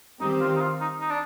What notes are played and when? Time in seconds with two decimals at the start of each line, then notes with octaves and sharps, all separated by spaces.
0.20 D#3 G3 C4 D#4 G4
0.41 F4
0.56 D#4
0.61 F4
0.81 D#4
1.00 D#4
1.10 D4